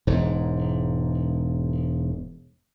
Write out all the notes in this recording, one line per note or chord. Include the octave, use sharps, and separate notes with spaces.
E1 G#2